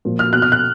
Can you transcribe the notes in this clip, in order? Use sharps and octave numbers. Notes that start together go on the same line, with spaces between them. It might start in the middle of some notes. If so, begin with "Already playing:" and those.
A#2 F3
F6
B2 F#6
F6
F#6